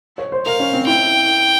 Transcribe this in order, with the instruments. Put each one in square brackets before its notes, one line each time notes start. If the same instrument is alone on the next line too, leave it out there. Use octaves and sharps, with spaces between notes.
[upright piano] C#5
C5
[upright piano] A#4 [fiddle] F5
[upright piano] C#4
C4
[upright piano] E4 [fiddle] G5